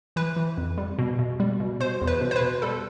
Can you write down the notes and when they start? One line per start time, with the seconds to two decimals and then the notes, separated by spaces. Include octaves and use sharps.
0.16 E3 B4
0.36 E3
0.57 F2
0.78 G3
0.99 B2
1.19 B2
1.40 G3
1.60 B2
1.80 B2 C5
2.01 E2
2.07 B4
2.21 B2
2.31 C5
2.36 B4
2.41 B2
2.62 G3 A4